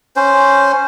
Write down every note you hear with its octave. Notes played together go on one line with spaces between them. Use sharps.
C#4 C5